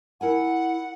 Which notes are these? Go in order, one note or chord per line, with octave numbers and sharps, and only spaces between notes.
E4 A#4 F#5 G#5